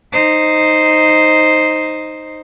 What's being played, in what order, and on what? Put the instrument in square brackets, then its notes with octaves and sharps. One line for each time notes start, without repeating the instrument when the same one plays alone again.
[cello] D#4 C5